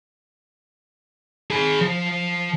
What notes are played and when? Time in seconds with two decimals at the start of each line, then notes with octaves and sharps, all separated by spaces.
1.51 G#4 B5
1.82 F3